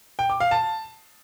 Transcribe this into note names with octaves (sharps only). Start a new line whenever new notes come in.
G5
D6
F5
A5